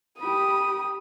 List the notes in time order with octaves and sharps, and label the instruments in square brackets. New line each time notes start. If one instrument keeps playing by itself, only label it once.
[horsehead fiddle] G4 B5 [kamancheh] D#6